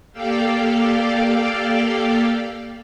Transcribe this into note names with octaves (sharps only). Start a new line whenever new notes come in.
A#3 G4 A4 D5 F5 G5